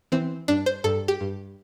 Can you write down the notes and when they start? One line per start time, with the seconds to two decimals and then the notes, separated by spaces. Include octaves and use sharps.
0.12 E3 C4
0.48 G2 D4
0.66 C5
0.84 G2 A4
1.08 G4
1.21 G2